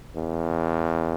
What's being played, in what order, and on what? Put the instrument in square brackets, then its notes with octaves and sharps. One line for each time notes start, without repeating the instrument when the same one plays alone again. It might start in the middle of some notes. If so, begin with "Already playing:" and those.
[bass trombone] E2